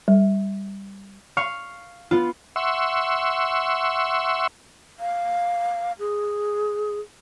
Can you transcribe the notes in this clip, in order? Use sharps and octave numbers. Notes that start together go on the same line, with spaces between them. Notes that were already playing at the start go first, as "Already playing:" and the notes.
G3
F5 C#6
B3 F4
E5 F#5 C6 C#6 E6
F5
G#4